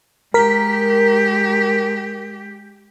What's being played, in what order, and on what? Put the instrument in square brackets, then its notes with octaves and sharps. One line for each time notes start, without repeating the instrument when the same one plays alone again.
[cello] G#3 G4 [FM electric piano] A#4 B6